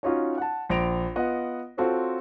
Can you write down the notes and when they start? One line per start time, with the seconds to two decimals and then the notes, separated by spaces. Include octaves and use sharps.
0.03 C#4 D#4 F4 F#4 C#5 D#5
0.38 F#5 A5
0.69 A#1 C6 A#6 D7 F7
1.16 B3 F4 D#5 F#5
1.77 C4 F4 F#4 A4 C5 C#5